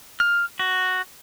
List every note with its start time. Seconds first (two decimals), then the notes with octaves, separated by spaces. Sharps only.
0.20 F6
0.59 F#4